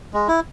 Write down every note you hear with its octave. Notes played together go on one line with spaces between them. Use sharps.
G#3
E4